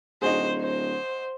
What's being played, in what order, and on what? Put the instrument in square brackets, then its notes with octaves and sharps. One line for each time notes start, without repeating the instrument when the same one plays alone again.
[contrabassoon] D1 [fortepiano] D#4 F#4 G#4 [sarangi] C5
[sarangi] C5